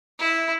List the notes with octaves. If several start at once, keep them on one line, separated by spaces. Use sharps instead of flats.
E4